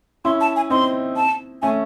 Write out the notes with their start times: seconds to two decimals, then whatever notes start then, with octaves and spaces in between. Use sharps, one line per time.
0.25 C#4 E4 C6
0.41 A5
0.56 G#5
0.70 C4 D#4 C6
1.16 A5
1.62 A3 C#4 G#5